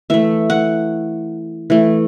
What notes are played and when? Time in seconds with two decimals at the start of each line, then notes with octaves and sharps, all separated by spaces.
0.10 E3 A3 E5
0.50 F#5
1.70 E3 A3